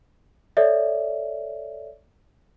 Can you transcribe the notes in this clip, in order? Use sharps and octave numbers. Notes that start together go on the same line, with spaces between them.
A4 C#5 D5 E5